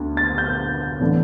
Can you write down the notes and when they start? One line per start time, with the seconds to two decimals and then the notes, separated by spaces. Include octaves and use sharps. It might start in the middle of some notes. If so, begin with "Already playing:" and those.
Already playing: D2 B3
0.17 A6
0.38 G6
1.00 A2 E3 B3 D4